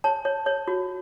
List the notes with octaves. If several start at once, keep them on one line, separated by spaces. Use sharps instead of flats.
C#5 A5
C#5
C#5
F#4